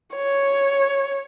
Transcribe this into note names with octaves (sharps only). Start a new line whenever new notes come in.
C#5